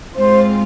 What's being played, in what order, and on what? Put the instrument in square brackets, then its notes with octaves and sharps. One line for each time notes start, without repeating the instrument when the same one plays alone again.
[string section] G#2 G#3 C4 F4 [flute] C5